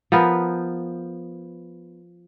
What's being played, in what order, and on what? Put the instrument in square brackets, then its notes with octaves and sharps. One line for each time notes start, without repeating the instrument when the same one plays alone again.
[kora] F3 B3 A#4 B4